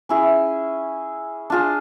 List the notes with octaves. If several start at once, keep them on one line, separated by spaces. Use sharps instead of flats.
C#4 E4 G#4
D4 F4 G#4